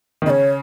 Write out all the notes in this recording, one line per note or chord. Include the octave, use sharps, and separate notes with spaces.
D#3
C#3 C#5 D#5